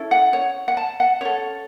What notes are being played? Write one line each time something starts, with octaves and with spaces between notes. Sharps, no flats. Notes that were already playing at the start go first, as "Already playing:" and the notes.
Already playing: C#4 E4 A4
F#5
C#5
F#5
A5
F#5
C#4 A4 C#5